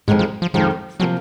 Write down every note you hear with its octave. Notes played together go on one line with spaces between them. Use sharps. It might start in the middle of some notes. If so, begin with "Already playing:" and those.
F2 G#2 D#3 G#3
F3
F3
F2 D#3 F3 G#3
C3 F3 F#3 A#3